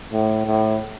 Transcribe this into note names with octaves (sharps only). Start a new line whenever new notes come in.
A2
A2